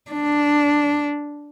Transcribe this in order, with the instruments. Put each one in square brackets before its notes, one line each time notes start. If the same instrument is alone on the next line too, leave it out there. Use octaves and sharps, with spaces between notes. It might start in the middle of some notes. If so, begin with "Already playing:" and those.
[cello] D4